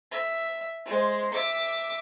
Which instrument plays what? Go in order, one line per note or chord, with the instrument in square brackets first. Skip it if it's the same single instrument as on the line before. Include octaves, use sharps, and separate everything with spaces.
[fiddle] E5
G#3 C5
E5 D6